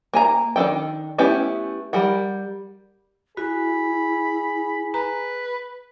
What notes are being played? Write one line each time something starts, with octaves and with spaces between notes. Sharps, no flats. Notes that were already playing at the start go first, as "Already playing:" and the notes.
A#3 G#5 A#5
D#3 D4 D#4 A4 G5
A3 B3 C#4 E4 G4
G3 A#4 F#5
E4 F#4 G#4 B5
B4 A#5